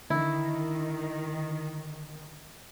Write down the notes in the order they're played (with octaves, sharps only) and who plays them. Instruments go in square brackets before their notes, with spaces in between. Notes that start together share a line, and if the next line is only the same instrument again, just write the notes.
[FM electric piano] D3 [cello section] D#3 [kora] E4